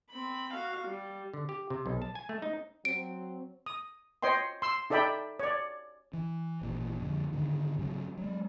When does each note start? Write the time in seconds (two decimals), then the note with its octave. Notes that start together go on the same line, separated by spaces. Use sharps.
0.11 C4 B5
0.53 F#4 F5
0.88 G3
1.34 D3
1.49 G4
1.70 C3
1.86 B1
2.02 A5
2.15 G#5
2.29 A3
2.42 D#4
2.85 F#3 C4 D7
3.66 D#6
4.22 C5 C#5 D#5 G5 C6
4.62 C6 E6
4.90 D#4 A4 D5 E5 G5 B5
5.40 C#5 D5
6.14 E3
6.61 G#1 A#2 E3
7.00 F2 D3
7.32 G#2 D3 D#3
7.79 G#2 C#3 F#3
8.17 F#3 G#3